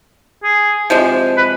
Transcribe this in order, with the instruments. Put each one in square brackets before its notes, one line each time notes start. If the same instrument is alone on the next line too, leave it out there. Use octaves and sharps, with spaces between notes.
[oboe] G#4
[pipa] C3 F3 G#3
[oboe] B4